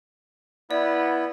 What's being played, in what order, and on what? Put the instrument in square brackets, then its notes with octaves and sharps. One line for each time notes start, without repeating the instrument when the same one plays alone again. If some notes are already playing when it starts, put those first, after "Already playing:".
[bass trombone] B3 [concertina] E4 [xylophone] D5